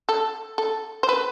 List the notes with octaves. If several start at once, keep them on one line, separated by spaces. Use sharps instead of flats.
A4
A4
C5
B4